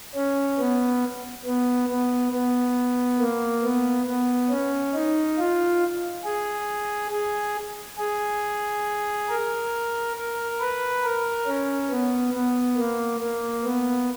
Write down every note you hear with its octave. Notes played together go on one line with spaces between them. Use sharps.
C#4
B3
B3
B3
B3
A#3
B3
B3
C#4
D#4
F4
G#4
G#4
G#4
A#4
A#4
B4
A#4
C#4
B3
B3
A#3
A#3
B3